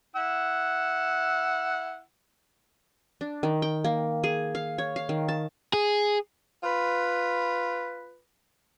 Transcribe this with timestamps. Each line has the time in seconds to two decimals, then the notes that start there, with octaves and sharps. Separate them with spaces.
0.16 E4 F#5 E6
3.21 D4
3.43 D#3
3.62 G5
3.84 A#3
4.24 G#4
4.55 F5
4.78 C#5
4.96 F5
5.09 D#3
5.28 A5
5.73 G#4
6.64 F4 B4